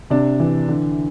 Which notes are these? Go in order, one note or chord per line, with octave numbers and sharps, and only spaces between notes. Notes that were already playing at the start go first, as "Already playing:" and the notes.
C3 D4
E3
D3